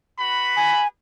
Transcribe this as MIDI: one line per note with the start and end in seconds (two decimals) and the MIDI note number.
0.19 0.85 66
0.19 0.85 71
0.19 0.85 83
0.57 0.87 80